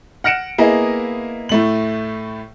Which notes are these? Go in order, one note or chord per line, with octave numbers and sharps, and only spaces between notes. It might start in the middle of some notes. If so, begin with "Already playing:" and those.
F#5 F6 A#6 C#7 D7 E7
A#3 B3 E4 G#4 D#5
A2 A3 F#7